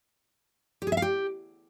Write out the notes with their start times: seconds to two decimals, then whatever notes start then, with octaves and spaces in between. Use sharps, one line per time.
0.82 G4
0.87 G#4
0.92 E5
0.97 F5
1.02 G4